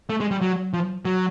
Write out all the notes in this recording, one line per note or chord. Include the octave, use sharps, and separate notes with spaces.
A3
G#3
G3
F#3
F3
F#3